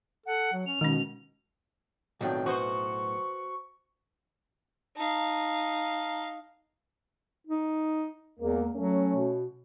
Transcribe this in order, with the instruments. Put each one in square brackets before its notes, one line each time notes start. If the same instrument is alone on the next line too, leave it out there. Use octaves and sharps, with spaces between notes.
[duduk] A4 [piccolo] F#5
[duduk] F#3
[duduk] C#4 [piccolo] F7
[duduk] B2 [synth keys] D#3 [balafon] G#3 C#4
[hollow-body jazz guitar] B1 A2 D4 [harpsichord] F2 D#3 F#3 [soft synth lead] G5
[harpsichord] B3 G#5 [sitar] F#4 C5 [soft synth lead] C#6
[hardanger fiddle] D#4 F5 [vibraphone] A5 A#5
[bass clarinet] D#4
[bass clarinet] E2 [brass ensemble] G#3 A#3
[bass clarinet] F#3 [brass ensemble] A3 C#4
[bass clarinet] B2